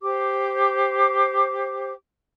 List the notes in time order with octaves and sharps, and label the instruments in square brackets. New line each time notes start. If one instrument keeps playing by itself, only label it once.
[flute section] G4 C5 D6